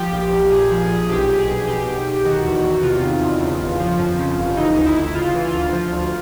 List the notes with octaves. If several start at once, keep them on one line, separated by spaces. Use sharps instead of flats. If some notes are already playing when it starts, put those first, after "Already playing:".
Already playing: F3 G4
A#1
A#1
A#2 G#4
F3
G#4
A#1
B1 G4
B1
G#4
B2
B2 G4
B1
B1
D#3 F#4
E2
E2
C3 F4
D#3
E2
C#3
G1
F3
F2
C#3
G1
E3 D#4
D2
E4
D2
C#3 F4
E3
F4
D2
F3
D2